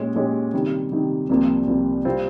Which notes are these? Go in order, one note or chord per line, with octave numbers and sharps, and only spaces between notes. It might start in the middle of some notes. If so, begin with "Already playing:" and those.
Already playing: A#2 G#3 C#4 G4
A#2 G#3 C#4 G4
C3 D#3 G3
C3 D#3 G3
C2 C3 F3 A#3
C2 C3 F3 A#3
C3 G3 C4 F4